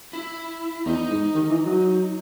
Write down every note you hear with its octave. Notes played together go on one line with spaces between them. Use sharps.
E4
E2 D#4
G#2
D#3
E3
F#3